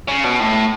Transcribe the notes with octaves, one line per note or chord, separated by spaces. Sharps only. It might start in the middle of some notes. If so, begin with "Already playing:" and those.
C#3
B2
A2